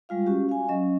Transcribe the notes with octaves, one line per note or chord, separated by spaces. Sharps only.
G3 G#3 F4 F5
C#4 F#4 G4
F5 G#5
F#3 C#4 D#5